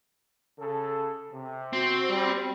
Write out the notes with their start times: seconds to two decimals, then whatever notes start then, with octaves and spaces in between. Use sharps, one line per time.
0.59 C#3 A4
1.33 C3
1.73 C4 F#4
2.10 G3